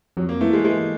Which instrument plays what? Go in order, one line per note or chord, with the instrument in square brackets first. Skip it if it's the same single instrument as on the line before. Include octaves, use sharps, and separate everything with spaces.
[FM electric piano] F2 [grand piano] F#3
[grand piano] A#3
[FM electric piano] E3 [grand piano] A3
[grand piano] G#3
[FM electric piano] E3 [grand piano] G#3